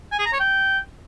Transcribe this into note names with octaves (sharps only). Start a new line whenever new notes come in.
G#5
G#4
A#5
C#5
G5